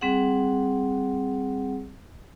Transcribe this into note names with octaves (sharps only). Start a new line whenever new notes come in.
G3 C4 G#4 F#5